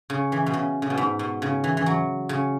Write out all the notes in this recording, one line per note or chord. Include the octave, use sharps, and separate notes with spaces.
C#3
E3
B2
C#3
C#3
B2
G#2
B2
C#3
E3
E3
F#3
C#3